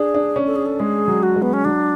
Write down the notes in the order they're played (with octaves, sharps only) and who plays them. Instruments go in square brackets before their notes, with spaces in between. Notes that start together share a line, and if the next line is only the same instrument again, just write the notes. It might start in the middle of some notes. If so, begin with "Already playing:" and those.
Already playing: [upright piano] D4 [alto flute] G#4
[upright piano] D4
C#4
[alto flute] A4
G#4
A4
[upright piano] G#3 [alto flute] G#4
[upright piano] F#3
[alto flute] F#4
[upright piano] G#3
[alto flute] B3
C#4
[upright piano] F#3 [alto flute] D4